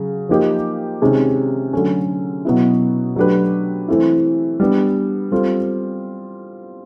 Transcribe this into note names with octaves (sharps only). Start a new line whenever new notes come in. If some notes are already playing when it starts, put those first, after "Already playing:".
Already playing: C#3 F#3
F3 A#3 D#4 G4 A#4
C3 D#3 G#3 C#4
D3 F#3 A3 C#4
B2 F#3 B3 E4
F#3 A3 D4 G4 B4
E3 A3 C4 E4
G3 B3 D4
G3 C4 F4 A4